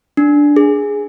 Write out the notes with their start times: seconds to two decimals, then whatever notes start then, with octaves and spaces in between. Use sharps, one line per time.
0.17 D4
0.56 G#4